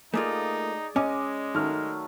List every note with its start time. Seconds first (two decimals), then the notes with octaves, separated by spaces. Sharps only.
0.14 A3 A#3 D#4 F4 G#4 D5
0.96 G#3 C#4 D#5 G#5 D6
1.55 D#3 F#3 A3 F6